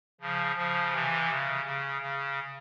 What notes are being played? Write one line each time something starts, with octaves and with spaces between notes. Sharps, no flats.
C#3 F3
C#3 F3
C3 E3
C#3
C#3
C#3